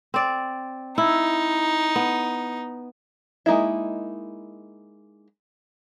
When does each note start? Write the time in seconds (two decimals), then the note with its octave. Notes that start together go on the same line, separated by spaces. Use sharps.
0.14 C4 D5
0.98 D#4 E4
1.96 B3
3.46 G#3 A#3 D#4 E4